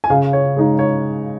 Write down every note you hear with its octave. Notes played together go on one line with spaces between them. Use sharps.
G#5
C#3 F5
C#5
G#3 D#4
C#5